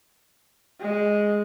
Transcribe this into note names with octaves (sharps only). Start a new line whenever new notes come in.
G#3